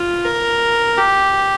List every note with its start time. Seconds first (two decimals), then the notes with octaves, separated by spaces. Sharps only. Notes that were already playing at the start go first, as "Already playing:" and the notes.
Already playing: F4
0.25 A#4
0.97 G4